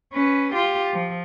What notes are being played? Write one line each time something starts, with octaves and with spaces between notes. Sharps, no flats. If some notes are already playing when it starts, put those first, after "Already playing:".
C#4 B4
F4 G4
F3